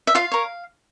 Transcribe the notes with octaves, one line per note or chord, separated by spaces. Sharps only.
E5
F4 F5
A#4 C#5